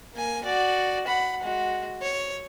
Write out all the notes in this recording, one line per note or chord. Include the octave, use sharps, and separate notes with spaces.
A#3 G#5
F#4 D5
F#5 B5
G#3 F#4
C#5